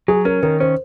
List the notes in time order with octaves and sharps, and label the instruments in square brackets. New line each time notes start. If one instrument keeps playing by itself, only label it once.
[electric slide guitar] F#3 [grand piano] G#4
[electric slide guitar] C#4 [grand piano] A#4
[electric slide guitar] D#3 [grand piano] A#4
[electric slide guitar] C#4 [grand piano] C5